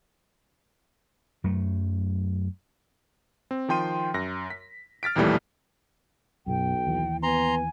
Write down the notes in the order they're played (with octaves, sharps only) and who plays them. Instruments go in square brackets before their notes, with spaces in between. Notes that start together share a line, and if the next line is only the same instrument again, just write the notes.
[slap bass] F#2 F#3 A3
[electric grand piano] C4
D#3 F3 G5 C6 D#7
F#2 A#6
B6
F6 A6 B6 D7
A#1 D#2 B2 E3 G3 A3
[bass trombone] B1 [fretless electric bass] F#2 B2 [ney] G5
[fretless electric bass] D#2 E3
[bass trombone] B3 [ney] G#5 [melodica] A#5 C6